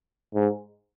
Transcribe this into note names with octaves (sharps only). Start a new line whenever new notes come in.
G#2